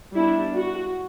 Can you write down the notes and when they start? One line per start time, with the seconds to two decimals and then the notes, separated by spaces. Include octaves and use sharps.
0.15 G3 B3 D4 E4
0.56 F#4